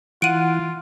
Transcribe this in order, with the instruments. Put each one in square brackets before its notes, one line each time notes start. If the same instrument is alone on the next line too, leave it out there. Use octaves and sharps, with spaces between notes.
[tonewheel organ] E3 [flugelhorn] F4 [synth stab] F#5 [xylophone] D7 D#7